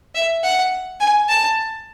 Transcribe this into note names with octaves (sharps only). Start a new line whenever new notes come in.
E5
F#5
G#5
A5